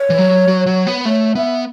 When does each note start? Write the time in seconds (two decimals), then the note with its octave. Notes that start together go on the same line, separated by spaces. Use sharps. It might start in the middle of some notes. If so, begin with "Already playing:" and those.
Already playing: C#5
0.10 E3
0.18 F#3
0.48 F#3
0.66 F#3
0.87 B3
1.05 A3 C#5
1.35 B3 E5